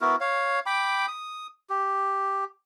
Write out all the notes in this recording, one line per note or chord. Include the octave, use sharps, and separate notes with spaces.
B3 E4 F#4 A#4
C#5 F5
G5 B5 D6
D#6
G4